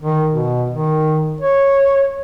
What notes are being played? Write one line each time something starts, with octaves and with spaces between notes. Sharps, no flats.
D#3
B2
D#3
C#5